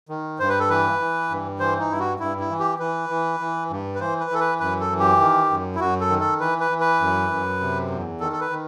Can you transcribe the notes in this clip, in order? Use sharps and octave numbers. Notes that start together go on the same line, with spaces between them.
D#3
G2 C5
B4
A4
E3 B4
E3
G2
E3 C5
D#4
G2 E4
F#4
G2 E4
E4
E3
G4
E3 B4
E3
E3
G2
B4
E3 C5
B4
E3 A4
B4
F#2 B4
A4
E3
G4
D#3
F#2
E4
F#2 F#4
A4
D#3
A4
E3 B4
B4
E3
B4
F#2
F#2
C3
E2
D#3 A4
A4
B4
D#3